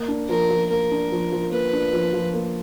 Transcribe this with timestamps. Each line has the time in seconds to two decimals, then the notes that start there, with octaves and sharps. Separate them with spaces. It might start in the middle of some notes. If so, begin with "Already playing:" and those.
Already playing: A#3
0.08 D4
0.29 F3 A#4
0.50 F3
0.70 A#3 A#4
0.91 D4
1.12 F3
1.32 F3
1.52 A#3 B4
1.73 D4
1.93 F3
2.13 F3
2.34 A#3